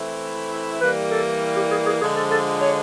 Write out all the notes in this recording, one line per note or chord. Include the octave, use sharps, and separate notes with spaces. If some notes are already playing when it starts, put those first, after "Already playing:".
Already playing: E3 A3 C4 E4
E3 G3 A#3 B4
A4
G4
G#4
G#4
D3 F3 G#3 G#4
A4
A4
C#5